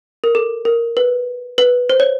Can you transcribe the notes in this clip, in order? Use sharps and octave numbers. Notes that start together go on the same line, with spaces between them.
A#4
A4
A#4
B4
B4
C5
C#5